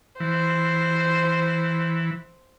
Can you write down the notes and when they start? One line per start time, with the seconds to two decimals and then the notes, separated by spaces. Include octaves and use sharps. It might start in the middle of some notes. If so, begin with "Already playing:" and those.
0.20 E3 C5